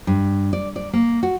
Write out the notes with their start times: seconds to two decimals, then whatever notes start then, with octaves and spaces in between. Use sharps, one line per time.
0.07 G2
0.53 D5
0.76 D5
0.93 A#3
1.23 F#4